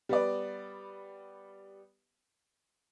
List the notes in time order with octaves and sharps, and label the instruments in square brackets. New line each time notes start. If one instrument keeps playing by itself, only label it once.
[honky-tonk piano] G3 B3 D5